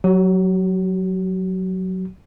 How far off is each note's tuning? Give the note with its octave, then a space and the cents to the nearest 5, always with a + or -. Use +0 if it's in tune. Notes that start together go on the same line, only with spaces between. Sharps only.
F#3 +0 F#4 +45